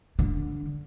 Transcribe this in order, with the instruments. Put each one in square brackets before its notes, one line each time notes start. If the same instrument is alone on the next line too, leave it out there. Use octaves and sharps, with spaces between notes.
[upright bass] D3